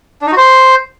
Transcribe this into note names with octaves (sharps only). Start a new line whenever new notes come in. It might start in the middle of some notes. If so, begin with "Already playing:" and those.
D4
D#4
F#4
C5